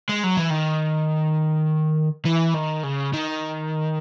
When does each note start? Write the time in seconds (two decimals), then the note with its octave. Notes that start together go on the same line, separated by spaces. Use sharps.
0.09 G#3
0.24 F#3
0.37 E3
0.50 D#3
2.25 E3
2.54 D#3
2.83 C#3
3.14 D#3